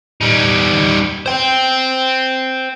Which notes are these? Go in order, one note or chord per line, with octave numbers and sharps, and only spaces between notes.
G3 D#4
C5 G5